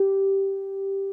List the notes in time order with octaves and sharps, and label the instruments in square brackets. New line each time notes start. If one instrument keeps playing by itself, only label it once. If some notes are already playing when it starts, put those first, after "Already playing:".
Already playing: [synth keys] G4